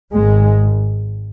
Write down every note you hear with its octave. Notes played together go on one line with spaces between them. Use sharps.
G#1 G#2 G#3